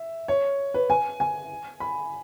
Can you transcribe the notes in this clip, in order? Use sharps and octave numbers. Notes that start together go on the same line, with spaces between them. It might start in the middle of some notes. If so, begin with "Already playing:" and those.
Already playing: E5
C#5
B4
G#5
G#5
B5